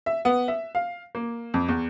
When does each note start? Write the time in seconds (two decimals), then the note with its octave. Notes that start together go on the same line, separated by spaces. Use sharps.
0.06 E5
0.25 B3
0.48 E5
0.75 F5
1.15 A#3
1.54 F2
1.68 E2